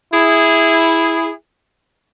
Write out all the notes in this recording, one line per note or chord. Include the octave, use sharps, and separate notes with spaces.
E4 G#4